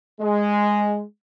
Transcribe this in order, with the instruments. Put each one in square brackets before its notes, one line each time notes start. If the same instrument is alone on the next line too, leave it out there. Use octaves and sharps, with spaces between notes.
[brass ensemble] G#3